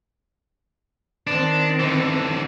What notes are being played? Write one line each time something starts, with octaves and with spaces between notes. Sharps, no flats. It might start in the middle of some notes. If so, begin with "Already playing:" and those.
D#3 C4 D4
D3 E3